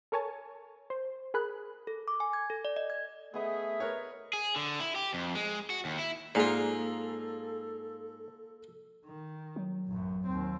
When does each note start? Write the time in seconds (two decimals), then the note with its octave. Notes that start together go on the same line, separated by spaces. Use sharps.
0.12 A4 A#4 C#5 G#5 A5
0.90 C5
1.34 G#4 A#4 B5 F#6
1.87 A4
2.08 D6
2.20 G#5
2.33 G#6
2.50 A4
2.65 D5
2.76 D#5
2.90 G#6
3.34 A3 B3 G#4 D#5 E5 D#6
3.80 A#4 B4 C#5
4.33 G#4
4.56 D3
4.80 E4
4.96 G4
5.14 F2
5.35 G#3
5.70 F#4
5.85 D#2
5.99 E4
6.35 G#2 A#3 F4 G#4 A4 D5
9.05 D#3
9.56 F#3
9.87 A1 F#2
10.26 D#2 C4